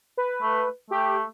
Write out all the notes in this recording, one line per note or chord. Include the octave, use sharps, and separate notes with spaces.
B4
A3
A3 G4